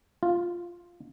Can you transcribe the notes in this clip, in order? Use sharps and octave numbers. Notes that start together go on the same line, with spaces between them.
F4